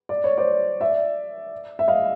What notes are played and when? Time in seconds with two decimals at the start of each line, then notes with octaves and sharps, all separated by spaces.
0.09 D5
0.24 C#5
0.38 C5 D5
0.81 D5 E5
1.79 E5
1.88 D#5 F5